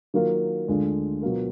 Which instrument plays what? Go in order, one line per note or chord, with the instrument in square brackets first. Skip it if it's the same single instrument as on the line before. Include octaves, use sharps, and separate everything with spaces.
[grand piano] D#3 F#3 A#3 F4 A#4
D2 D3 G#3 D4 F4
B2 F#3 B3 F4 A#4